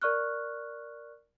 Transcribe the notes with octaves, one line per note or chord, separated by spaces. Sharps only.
A#4 D5 C#6 F6 F#6